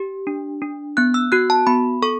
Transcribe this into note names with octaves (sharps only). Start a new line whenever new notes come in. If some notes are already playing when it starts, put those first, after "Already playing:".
Already playing: G4
D4
D4
B3 F#6
E6
F#4 F#6
A5
B3 B5
A4 C#6